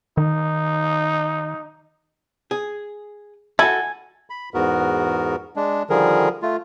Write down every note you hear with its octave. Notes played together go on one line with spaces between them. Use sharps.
D#3 D#4
G#4
E4 F#4 A4 G#5
B5
E2 G#2 B3 F#4 A#4
G#3 D4
D3 D#3 F3 G3 G#4 A#4
A3 F4